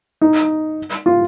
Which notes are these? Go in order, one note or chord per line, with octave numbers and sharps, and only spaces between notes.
D#4
F4